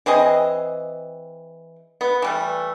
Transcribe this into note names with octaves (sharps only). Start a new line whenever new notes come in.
E3 C4 G#4 D#5
B3
E3 G3 A3